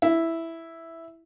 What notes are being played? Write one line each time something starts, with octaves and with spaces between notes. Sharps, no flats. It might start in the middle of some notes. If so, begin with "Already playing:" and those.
E4